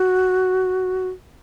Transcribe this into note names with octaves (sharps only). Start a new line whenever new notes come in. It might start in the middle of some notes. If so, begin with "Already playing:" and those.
Already playing: F#4